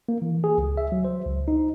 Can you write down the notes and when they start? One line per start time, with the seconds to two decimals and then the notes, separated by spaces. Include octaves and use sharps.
0.09 A#3
0.22 E3
0.44 G#4
0.58 C#2
0.77 E5
0.92 F#3
1.04 C5
1.26 C#2
1.48 D#4